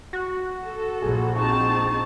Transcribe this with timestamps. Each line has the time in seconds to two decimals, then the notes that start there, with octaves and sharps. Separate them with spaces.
0.13 F#4
0.65 A4
1.02 A#1 G#4
1.36 C4 D#4 A5 C#6